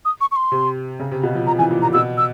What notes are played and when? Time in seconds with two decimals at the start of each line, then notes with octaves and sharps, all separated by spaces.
0.05 D#6
0.21 C#6
0.32 C#6
0.36 C6
0.52 C3
1.00 C#3
1.11 C3
1.23 B2
1.35 F3
1.47 F3 A#5
1.59 E3 G#5
1.71 A#2
1.82 A#2 A#5
1.93 B2 E6
2.18 E6